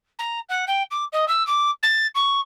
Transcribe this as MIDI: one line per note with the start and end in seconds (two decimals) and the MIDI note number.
0.19 0.40 82
0.49 0.65 78
0.67 0.83 79
0.91 1.05 86
1.13 1.28 75
1.28 1.46 88
1.47 1.71 86
1.83 2.07 93
2.15 2.41 85